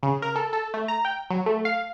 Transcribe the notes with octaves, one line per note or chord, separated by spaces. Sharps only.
C#3
A#4
A4
A4
A3
A#5
G5
F#3
A3
F5